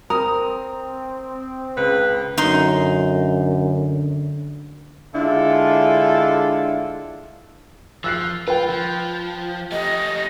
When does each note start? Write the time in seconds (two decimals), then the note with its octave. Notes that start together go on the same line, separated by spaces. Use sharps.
0.10 C4 A#4 D#6
1.77 C#2 B4
2.38 F#2 D3 D#4 C6
5.15 D3 G#3 D4 E4 F4 A4
8.04 F3 E6 F#6 C7
8.48 F4 B4 G5
8.70 F3
9.72 A3 G4 D#5